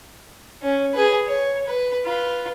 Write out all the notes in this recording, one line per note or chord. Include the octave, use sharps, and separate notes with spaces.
C#4
G#4 B4
C#5
B4
F4 B4